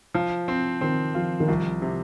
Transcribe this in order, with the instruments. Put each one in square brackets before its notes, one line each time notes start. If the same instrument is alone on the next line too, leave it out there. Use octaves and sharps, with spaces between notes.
[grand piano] F3
C4
[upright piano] D#3 [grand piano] C4
[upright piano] F3 [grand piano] F4
[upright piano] D#3
[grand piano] C2 [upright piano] F3
[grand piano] C3